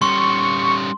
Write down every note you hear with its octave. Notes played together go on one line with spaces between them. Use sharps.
G3 C#4 C6 C#6